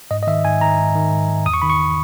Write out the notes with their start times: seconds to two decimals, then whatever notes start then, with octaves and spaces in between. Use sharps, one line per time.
0.11 G#2 D#5
0.23 D#5
0.27 D#3 E5
0.45 G#2 G#5
0.61 D#3 A#5
0.78 G#2
0.95 D#3
1.12 G#2
1.29 D#3
1.46 E2 D#6
1.54 C#6
1.62 D#3 B5
1.70 C#6